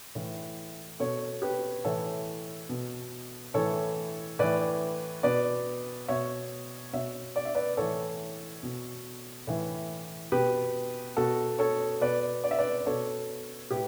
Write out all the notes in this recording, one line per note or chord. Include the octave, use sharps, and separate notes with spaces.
A2 E3
B2 A4 C#5
G4 B4
A2 E3 A4 C#5
B2
A2 E3 A4 C#5
A2 E3 B4 D5
B2 B4 D5
B2 C#5 E5
B2 C#5 E5
D5
E5
B4 D5
A2 E3 A4 C#5
B2
A2 E3
B2 G4 B4
B2 F#4 A4
A4 C#5
B2 B4 D5
D5
E5
B4 D5
B2 A4 C#5
A2 G4 B4